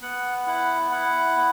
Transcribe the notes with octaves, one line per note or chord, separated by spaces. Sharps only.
B3 F#5
E4 F#5
E4 F#5
B3